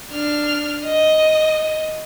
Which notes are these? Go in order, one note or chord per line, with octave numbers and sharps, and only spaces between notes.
D4 F6
D#5